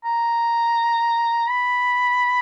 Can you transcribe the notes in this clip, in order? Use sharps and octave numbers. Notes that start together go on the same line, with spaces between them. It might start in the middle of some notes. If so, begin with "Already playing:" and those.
A#5
B5